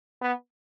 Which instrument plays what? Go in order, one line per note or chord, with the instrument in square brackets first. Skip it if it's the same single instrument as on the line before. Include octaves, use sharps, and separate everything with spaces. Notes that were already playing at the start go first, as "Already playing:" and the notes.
[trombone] B3